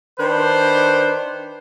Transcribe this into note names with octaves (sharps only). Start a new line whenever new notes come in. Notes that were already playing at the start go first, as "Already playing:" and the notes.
D#3 D4 B4 C5